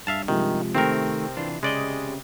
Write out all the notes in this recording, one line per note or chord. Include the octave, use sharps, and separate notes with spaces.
G2 E5 F5 A5
C3 D#3 F3 G#3
C3 D#3 A3 C4 A#4 G5
E3 D4 F4
C#3 G#3 D5 D#5